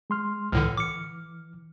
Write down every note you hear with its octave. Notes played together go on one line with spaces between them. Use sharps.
G#3 C6 F6
C#2 A2 D3 E3 F6
D6 C#7